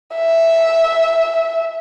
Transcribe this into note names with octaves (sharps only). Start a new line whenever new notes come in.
E5